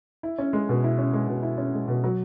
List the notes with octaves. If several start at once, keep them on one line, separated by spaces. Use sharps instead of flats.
E4
C#4
G#3
B2
E4
C#4
G#3
B2
E4
C#4
G#3
B2
F#3